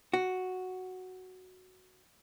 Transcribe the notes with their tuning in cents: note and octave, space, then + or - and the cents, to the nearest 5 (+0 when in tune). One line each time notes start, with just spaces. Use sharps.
F#4 +0